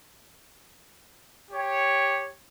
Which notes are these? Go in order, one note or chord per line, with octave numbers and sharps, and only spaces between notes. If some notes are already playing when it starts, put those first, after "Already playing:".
G4 C#5